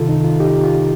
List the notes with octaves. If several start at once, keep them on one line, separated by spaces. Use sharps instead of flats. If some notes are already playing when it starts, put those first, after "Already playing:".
Already playing: C2 C3 D#3 F4 A4
D#4
F4
D#4 G4
F4